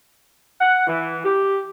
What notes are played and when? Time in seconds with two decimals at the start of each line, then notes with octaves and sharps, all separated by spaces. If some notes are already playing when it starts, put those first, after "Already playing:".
0.60 F#5
0.87 E3
1.24 G4